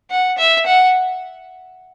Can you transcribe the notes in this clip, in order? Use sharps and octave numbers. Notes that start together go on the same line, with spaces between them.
F#5
E5
F#5